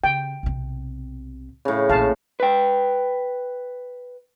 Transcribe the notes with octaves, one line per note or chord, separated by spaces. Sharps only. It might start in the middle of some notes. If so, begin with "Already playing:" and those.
C#3 G5
B1 C3
A2 C#3
A#1 A#2 F5 A5
B4 G5